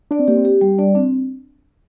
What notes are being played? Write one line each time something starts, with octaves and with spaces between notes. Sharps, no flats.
D4 D5
C4
A#3 G4
C4
G4
G3
D4 D5
C4 D4